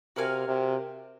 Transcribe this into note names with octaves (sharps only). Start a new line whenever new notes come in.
C3 F#4 A#4 F5 G#5
C3